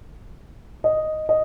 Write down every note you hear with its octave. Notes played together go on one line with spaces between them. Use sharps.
D#5
D#5